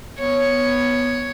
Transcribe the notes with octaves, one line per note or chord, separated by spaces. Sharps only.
B3 C#5